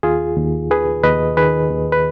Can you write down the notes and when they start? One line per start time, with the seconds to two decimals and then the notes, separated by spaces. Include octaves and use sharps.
0.03 D#2 F4 G#4
0.37 D#2
0.70 D#3 G#4 B4
1.03 D#2 B4 D#5
1.37 D#3 G#4 B4
1.70 D#2
1.92 B4